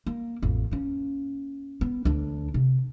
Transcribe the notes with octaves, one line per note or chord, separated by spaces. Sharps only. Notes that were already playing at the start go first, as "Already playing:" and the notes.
A#3
A1 F2
A#3 C#4
B3
D2 D4
C3